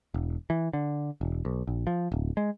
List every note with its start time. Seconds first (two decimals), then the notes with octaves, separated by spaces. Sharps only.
0.14 E1
0.50 E3
0.73 D3
1.21 E1
1.45 B1
1.67 A#1
1.87 F3
2.12 D1
2.37 G#3